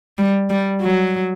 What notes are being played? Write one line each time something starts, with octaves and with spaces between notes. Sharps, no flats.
G3
G3
F#3